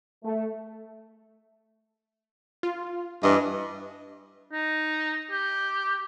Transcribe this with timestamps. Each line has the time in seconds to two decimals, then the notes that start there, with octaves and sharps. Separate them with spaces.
0.24 A3
2.63 F4
3.23 G2 E3 D#5
4.52 D#4
5.31 G4